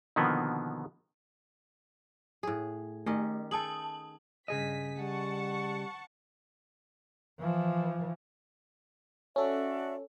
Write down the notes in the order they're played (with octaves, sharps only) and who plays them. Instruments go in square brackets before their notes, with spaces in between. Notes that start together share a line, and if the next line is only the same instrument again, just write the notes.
[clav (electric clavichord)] B2 D3 D#3 F3 A#3 B3
[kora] A2 G#4
[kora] D#3 C#4 D#5 [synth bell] A3
[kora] G#4 A4 [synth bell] A5 D#6 F#7
[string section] G2 B6 [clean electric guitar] C#3 G#4 D#5
[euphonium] G3 [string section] F#5 A5 C#6
[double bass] E3 F3
[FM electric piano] C#4 A4 [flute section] F#4 D5 E5